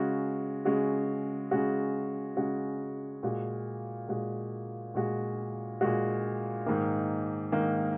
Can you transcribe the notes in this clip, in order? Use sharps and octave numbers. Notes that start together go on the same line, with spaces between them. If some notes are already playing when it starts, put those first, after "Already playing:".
Already playing: C#3 G#3 F#4
C#3 G#3 F#4
C#3 G#3 F#4
C#3 G#3 F#4
A#2 G#3 F#4
A#2 G#3 F#4
A#2 G#3 F#4
A#2 G#3 F#4
G#2 D#3 A#3
G#2 D#3 A#3